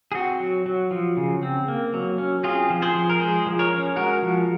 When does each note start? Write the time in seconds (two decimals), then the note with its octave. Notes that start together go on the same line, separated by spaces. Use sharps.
0.12 G#4
0.14 C4 F#4
0.40 F#3
0.66 F#3
0.91 F3
1.17 C#3
1.43 C4
1.68 A#3
1.94 F#3
2.18 C#4
2.43 C4 F4 G#4
2.70 F3
2.82 G#4 C5
2.95 F3
3.10 A#4
3.20 G#3 G#4 C5
3.46 F3
3.59 A#4 C#5
3.72 C#4
3.96 G#3 F#4 A#4
4.22 F3